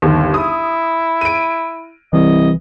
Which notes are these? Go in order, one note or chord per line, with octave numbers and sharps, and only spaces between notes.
G1 D#2
E4 D#6
D7 D#7
C2 E3 D#5